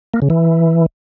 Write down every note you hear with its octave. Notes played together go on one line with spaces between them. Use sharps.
A#3
C#3
E3